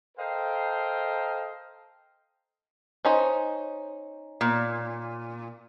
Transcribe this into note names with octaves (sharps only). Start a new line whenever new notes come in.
A4 A#4 C5 D#5 F5 G5
C#4 D#4 C5
A#2